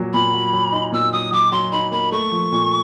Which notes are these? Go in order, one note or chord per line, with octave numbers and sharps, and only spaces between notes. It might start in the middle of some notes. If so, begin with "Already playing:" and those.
Already playing: A#2 F#3
A#2 B5
F#3
F#3
D#4
A#2 E6
F#3 D#6
F#3 D6
F#3 C6
D#4 B5
A#3 B5
A3 C#6
F3
A#2